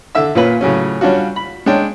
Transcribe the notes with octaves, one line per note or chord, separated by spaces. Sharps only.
D3 E5 E6
A#2 C#4 F4 B4 B5
A2 C#3 F#3 C#4
G3 C#4 D4 F4 F#4
B5
G#3 C#4 D4 G5